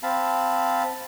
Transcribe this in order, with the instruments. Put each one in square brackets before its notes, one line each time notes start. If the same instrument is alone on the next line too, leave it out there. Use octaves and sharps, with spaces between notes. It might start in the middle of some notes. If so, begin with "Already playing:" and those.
[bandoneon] C4 F5 A5 B5